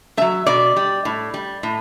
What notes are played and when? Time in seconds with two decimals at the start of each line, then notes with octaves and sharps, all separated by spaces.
0.17 F#3 A3 E5
0.46 B2 D5
0.76 G3
1.05 A2
1.34 G3
1.63 A2